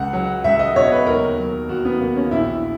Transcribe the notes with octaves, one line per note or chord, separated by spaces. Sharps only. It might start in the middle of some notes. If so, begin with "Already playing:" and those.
Already playing: C#2 F#5
F#3
C#2 E5
D#5
B2 C#5
B4
D#2 A#4
F#3
D#2 F#4
B3
C#3 A#3
C#4
A#1 E4